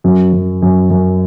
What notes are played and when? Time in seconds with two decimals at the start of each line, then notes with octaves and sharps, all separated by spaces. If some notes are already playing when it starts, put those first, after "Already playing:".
0.04 F#2
0.33 F#2
0.62 F#2
0.90 F#2